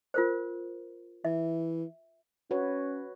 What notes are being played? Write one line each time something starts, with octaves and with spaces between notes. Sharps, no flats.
F4 A#4 C5
E3 E5
C#4 F#4 B4 C#5